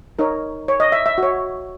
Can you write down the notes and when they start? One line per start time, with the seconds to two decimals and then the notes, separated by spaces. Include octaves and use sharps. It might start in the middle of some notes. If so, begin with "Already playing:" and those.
0.19 D#4 A#4 C#5
0.68 C#5
0.80 D#5
0.92 E5
1.06 E5
1.18 F#4 C#5